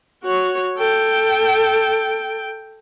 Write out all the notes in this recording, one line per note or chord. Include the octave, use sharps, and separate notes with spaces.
F#4 C#5
A4 G5